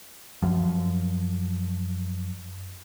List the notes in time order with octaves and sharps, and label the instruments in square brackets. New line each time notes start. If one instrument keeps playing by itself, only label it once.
[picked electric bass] F#2 F3